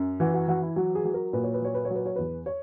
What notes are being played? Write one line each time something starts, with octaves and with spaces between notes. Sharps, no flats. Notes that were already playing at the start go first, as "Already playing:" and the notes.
Already playing: F#2
E3 F#4
F#4
E3 F#4
E4
F#3 F#4
G#4
F#3
A#4
A#2 B4
C#5
B4
F#3 C#5
B4
C#5
F#3 B4
C#5
E2 B4
C#5